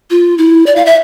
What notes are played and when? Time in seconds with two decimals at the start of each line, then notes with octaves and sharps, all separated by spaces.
0.10 F4
0.38 E4
0.66 D5
0.76 F5
0.86 E5